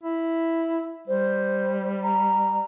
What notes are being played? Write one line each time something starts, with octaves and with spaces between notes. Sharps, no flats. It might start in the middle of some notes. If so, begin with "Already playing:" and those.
E4
G3 C5
A#5